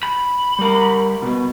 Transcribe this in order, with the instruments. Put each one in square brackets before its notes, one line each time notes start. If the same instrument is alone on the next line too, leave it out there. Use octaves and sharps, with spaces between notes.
[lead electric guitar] B5
[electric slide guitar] G3 A#4
B2 B3